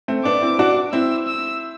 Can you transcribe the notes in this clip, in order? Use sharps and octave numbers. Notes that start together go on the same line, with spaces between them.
A3 C4
B3 D4 D6
C4 E4
D4 F#4
C4 E4 E6
E6